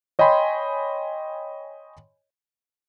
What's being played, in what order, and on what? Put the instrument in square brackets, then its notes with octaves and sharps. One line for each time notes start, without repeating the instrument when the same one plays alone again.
[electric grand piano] C#5 D#5 G5 G#5 B5 C6